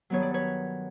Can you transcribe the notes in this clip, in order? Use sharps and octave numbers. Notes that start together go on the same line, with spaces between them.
G2 D#3 F#3 B3 C#5
D5
B4 C#5